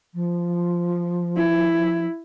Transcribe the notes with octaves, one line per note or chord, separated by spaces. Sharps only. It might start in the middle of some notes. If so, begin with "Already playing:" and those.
F3
E4